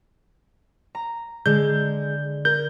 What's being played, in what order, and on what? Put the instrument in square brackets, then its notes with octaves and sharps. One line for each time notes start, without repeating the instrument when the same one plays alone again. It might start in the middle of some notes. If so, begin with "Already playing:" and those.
[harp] A#5
[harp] D3 [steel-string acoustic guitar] G#3 [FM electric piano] G6
[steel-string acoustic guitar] A#4 [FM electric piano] G6